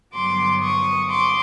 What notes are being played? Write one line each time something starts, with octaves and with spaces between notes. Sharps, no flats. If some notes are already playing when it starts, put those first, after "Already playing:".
G2 D3 F#3 B3 C6 D6
C#6 D#6
C6 D6